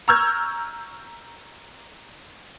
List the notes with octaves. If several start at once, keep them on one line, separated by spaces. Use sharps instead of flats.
A#5 C#6 E6 F6 G6 G#6